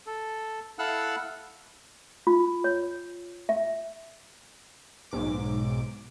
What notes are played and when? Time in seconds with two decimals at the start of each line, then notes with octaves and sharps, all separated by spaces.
0.07 A4
0.79 E4 A4 F5 F#5 E6 F#6
2.27 F4
2.64 C#5
3.49 E5
5.11 B1 G#2 D6